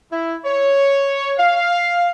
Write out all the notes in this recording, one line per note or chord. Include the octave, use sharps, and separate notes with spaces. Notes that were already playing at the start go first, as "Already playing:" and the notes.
E4
C#5
F5